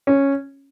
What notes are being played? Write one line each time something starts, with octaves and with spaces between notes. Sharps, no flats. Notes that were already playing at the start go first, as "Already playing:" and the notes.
C#4